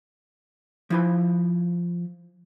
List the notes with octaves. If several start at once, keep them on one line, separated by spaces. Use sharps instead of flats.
F3 E4 B5